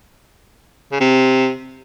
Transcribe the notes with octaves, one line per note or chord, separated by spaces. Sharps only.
C#3
C3